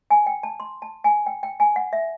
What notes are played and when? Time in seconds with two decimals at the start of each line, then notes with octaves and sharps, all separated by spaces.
0.11 G#5
0.26 G5
0.43 A5
0.60 C6
0.82 A5
1.04 G#5
1.26 G5
1.43 G5
1.60 G#5
1.76 F#5
1.93 E5